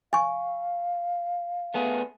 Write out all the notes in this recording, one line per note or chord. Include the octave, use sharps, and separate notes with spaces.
F5 G#5 C#6
A3 B3 G#4